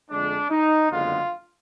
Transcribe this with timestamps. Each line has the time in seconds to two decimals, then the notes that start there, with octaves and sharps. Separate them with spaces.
0.10 F2 D3 G#3 D4
0.51 D#4
0.91 F#1 F2 D3 G#3 B3 F4